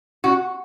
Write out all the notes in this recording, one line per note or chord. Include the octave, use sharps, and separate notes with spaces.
F#4